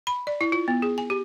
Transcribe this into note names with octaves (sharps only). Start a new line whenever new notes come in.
B5
D5
E4
F4
B3
G#4
G#5
G4